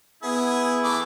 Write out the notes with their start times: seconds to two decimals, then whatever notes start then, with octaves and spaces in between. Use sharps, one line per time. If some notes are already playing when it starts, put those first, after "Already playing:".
0.23 B3 E4 G#4
0.84 E3 A3 D6